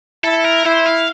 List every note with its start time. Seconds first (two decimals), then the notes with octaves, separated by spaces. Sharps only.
0.24 E4 A4
0.44 A#4
0.65 E4 C5
0.86 F5